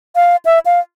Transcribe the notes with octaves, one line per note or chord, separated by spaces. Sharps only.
F5
E5
F5